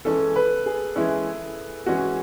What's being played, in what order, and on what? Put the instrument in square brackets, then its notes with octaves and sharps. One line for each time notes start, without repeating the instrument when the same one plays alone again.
[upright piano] E3 G#3 C#4 [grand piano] A4
[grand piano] B4
G#4
[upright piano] E3 G#3 C#4 [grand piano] E4
[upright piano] E3 G#3 C#4 [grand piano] F#4